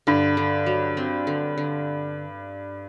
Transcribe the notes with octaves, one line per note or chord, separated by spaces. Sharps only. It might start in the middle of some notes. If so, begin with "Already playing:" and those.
G2 D3
D3
F#3
C4
D3
D3